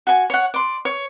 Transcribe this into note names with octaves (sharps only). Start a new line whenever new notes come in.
F#4 G#5
C#5 F#5
D5 C6
C#5